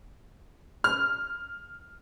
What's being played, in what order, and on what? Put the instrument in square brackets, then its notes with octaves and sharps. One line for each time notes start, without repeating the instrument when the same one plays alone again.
[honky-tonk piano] F6